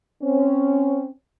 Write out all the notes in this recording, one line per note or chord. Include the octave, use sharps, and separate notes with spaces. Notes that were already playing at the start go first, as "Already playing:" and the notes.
C4 C#4